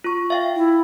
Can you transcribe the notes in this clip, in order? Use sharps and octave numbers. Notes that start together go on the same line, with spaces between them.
F4 C#6
E5 F5 G5
E4